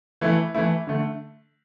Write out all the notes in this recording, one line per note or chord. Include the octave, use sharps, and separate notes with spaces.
E3 A3 E4
E3 A3 E4
D3 A3